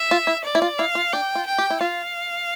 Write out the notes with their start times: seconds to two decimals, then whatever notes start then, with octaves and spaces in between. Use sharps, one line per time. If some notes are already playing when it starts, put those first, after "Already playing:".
Already playing: E5
0.11 F4
0.27 E4
0.45 D5
0.55 E4
0.62 F4
0.79 E4 F5
0.95 F4
1.13 D4 G5
1.35 F4
1.47 G5
1.58 G4
1.70 E4
1.81 F4 F5